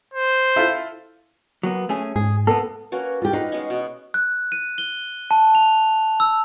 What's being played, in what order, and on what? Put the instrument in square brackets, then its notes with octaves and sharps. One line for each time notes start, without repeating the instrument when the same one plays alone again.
[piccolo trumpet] C5
[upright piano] E4 F4 A4
[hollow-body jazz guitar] F#3 A#3 B3
A3 C#4 G#4
[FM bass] G#2 [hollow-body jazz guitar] G#4
[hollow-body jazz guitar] A#3 B3 [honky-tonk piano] A4
[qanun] A#3 C#4 F#4 [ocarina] B4
[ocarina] E4 [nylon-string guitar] F4 G4
[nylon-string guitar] D#4 [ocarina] F4 [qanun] B4 F5
[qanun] G#3 B3 C#4 [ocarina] D#5
[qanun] B2
[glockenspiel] F#6
D#7
G7
A5
F7
E6